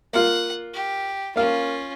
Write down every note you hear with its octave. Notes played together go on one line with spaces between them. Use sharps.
A#3 F4 F#5
G4
A#3 C#4 F4 F5